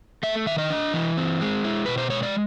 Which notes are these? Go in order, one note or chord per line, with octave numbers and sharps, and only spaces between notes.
A3 E5
D#3 E5
D#5
D4
E3
C4
G#3
E4
B2 B4
C5
G#3 C#5
D5